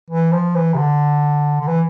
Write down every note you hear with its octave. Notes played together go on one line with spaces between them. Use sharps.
E3
F3
E3
C3
D3
D3
E3